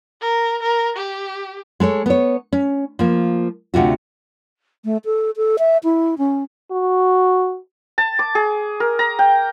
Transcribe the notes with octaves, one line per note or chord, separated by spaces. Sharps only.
A#4
A#4
G4
G#3 A4 B4 C#5
B3 C#5
C#4
F3 A#3
D2 C3 F4 F#4
A3
A4
A4
E5
E4
C#4
F#4
A5
D6
G#4
A#4
A#5
G5